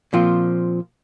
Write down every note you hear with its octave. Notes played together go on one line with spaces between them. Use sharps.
A#2 F3 C4 F4